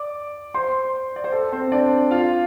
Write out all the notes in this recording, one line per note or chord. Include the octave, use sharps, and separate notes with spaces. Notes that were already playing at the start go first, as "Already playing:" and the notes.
Already playing: D5 D6
C5 C6
D5
C5
A4
C4 C5
D4 D5
F4 F5